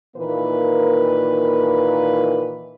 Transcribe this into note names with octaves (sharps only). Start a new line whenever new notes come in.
A#2 D#3 E3 A#3 B4